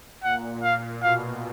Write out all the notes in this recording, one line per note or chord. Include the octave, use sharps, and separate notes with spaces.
A#2 F#5
F5
B2 F5